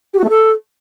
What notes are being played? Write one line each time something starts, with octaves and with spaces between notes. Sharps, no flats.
G4
F#4
A3
A4